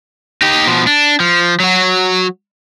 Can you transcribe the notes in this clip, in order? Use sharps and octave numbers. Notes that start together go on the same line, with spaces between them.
D#4 G4
B2 F3
D4
F3
F#3 F#4